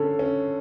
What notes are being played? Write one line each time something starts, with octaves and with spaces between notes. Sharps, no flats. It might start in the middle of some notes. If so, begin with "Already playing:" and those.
Already playing: D3 C#4 A4
C#4